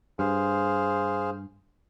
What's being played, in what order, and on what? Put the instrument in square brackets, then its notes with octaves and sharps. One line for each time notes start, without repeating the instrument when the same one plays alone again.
[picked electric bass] G2 [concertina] G#4 C5 F5